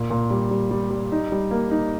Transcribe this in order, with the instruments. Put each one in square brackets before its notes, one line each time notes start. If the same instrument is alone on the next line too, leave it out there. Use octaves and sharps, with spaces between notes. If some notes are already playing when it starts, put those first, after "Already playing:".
Already playing: [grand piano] A#2
A#2
G3
G3
G3
G3
D#4
G3
A#3
D#4